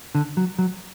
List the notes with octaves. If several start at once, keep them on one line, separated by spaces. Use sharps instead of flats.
D3
F#3
F#3